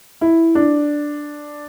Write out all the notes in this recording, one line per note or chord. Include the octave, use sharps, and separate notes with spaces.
E4
D4